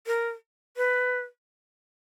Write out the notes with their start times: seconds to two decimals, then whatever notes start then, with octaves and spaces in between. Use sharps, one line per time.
0.07 A#4
0.77 B4